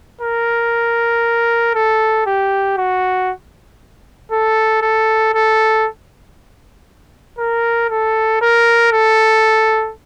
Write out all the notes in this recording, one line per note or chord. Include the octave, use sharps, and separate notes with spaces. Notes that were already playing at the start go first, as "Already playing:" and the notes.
A#4
A4
G4
F#4
A4
A4
A4
A#4
A4
A#4
A4